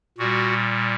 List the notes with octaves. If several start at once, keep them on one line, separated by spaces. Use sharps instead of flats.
A#2 G3 F#4